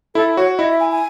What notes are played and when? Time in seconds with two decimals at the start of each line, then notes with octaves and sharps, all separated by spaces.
0.15 E4 A4
0.37 F#4 C#5
0.58 E4 D#5
0.70 E5
0.80 G#5
0.92 G#5